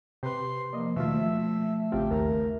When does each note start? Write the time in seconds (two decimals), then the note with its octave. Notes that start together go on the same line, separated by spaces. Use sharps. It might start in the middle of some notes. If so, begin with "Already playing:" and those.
0.23 C3 G4 B4 C6
0.73 F3 A#3 D5 D#5
0.96 D#2 B2 A3 F4 E5
1.17 F3
1.92 A1 C#3 C4 F4 G4
2.11 D#2 A#4